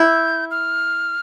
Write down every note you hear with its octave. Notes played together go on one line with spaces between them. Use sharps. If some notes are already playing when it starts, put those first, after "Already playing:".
Already playing: E4 G6
F6